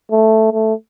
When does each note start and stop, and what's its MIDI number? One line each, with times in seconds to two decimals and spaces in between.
0.11 0.48 57
0.52 0.74 57